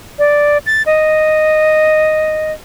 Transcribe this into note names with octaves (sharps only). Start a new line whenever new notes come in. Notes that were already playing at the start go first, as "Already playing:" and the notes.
D5
A6
D#5